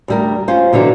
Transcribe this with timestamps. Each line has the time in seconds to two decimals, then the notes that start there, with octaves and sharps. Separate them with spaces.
0.08 D2 G3 A#4
0.48 C#4 F4 C5
0.73 B2 D3 E3 F#3